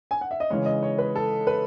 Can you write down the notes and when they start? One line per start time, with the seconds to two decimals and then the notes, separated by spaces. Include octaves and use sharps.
0.11 G#5
0.21 F#5
0.31 E5
0.40 D#5
0.50 C#3 E3 G#3 C#5
0.66 D#5
0.83 C#5
0.98 B4
1.16 A4
1.47 B4